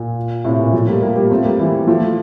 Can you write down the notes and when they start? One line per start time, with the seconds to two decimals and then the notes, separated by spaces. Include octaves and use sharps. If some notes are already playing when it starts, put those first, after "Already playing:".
Already playing: A#2
0.44 A2 C3
0.59 A#2
0.73 F3 A3
0.88 G3 A#3
1.02 G3 A#3
1.16 G3 A#3
1.30 A3 C4
1.44 G3 A#3
1.59 E3 G3
1.87 F3 A3